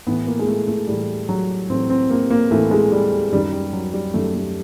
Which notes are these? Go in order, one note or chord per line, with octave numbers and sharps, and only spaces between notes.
A2 E3 B3
A#3
G#3
A3
A3
A2 E3 G3
F#3
A2 E3 C4
C4
A#3
A#3
A2 E3 A3
G#3
G3
F#2 D#3 F#3 G3
G3
F#3
G3
F#2 D#3 F#3 A3
A3